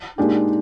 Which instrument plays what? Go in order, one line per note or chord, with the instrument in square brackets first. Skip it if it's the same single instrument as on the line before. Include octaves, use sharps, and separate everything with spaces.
[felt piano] A#2 G#3 D4 G4 [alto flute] D#4